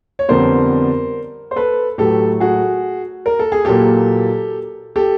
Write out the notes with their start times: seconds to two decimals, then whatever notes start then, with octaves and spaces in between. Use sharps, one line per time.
0.19 C#5
0.28 F2 D3 G3 B3 A#4 C5
1.51 C5
1.56 A4 B4
1.98 A2 F#3 A3 G4 A4
2.40 F#4 G#4
3.26 A#4
3.39 A4
3.52 G#4
3.65 A#2 F#3 A#3 G4 A4
4.96 G4 A4